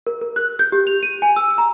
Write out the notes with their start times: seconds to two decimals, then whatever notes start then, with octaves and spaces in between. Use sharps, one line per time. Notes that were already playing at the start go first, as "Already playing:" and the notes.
0.07 A#4
0.21 A#4
0.36 F#6
0.59 G6
0.72 G4
0.87 F7
1.03 D#7
1.22 G#5
1.36 E6
1.58 A#5